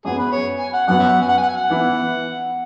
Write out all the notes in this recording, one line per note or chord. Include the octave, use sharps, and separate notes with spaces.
F#2 F#3 B3 G#4
B4
C#5
G#5
F#5
F#2 F#3 B3 F#5
E5
F#5
G#5
F#5
G#5
F#5
G#5
F#5
E3 B3 E4